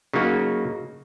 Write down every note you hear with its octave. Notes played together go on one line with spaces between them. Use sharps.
C#3 F#3 A#3 D#4 F#4